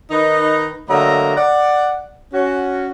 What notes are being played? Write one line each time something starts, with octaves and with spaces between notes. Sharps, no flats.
D#3 D#4 B4
D3 F#3 A3 A#3 D#5 A#5
D5 F#5
C#4 F#4